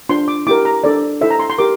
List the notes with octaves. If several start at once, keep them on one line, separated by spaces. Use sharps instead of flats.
D4 F4 C5 C6
D6
E4 G4 A#4 D6
A#5
D4 A4 C5 D5
E4 A4 C5 E5
A#5
C6
C6
G4 A#4 D6